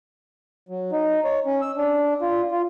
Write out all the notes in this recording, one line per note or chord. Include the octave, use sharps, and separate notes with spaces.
F#3
D#4
C#5
C#4
E6
D4
F4
F4